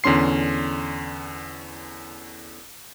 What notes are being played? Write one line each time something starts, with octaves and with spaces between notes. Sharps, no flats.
E2 D3 C#4 C6 C7